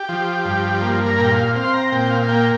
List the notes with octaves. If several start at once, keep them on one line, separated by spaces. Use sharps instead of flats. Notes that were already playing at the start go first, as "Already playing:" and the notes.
Already playing: G4
F3
G2
A#3
A#4
A#2
G5
F5
C4 F5
C6
A#5
A#2 G5
F5
F5
A#3 G5